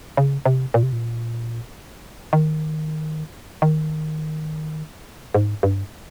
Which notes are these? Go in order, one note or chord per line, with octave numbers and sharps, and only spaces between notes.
C#3
C3
A#2
C3
A#2
D#3
D#3
G#2
G2